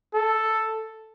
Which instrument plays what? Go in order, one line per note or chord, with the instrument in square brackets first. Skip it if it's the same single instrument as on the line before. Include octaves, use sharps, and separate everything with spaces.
[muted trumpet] A4